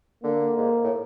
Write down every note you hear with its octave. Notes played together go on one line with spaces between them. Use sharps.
D3 A#3
G#2
A2